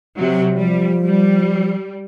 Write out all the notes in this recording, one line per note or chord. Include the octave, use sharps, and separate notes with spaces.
C3 F#3
F3 G3
G3